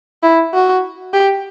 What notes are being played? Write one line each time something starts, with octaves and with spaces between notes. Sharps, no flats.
E4
F#4
G4